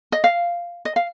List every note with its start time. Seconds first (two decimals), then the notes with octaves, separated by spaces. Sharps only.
0.12 D#5
0.24 F5
0.85 D#5
0.96 F5